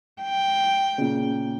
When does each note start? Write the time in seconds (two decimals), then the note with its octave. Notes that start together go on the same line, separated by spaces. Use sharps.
0.22 G5
0.98 A#2 C#3